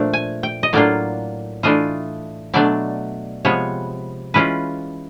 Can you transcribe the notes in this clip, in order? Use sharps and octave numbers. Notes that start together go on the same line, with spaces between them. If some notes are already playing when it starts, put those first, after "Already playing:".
Already playing: A#2 F3 A3 D4
G#5
G5
D#5
A2 F#3 A#3 D4 F4 D5
E3 A3 D4 F4 D#5
B2 F#3 A3 D4 D5
C3 F3 G#3 B3 C#5
E3 G#3 C#4 F4 B4